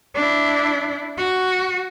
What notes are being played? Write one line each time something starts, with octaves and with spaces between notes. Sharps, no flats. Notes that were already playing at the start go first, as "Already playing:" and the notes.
D4 E4
F#4